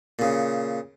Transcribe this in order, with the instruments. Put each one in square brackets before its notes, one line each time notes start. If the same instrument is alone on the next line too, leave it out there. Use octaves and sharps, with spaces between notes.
[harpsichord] A#2 C#3